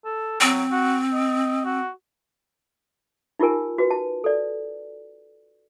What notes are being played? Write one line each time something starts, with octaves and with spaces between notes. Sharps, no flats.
A4
F#3 C4
F#4
D#5
F#4
D#4 F4 G4 A#4 G#5
F#4 B4
A5
A4 D5